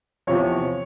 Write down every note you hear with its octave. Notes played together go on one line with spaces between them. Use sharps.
E2 C3 F3 C#5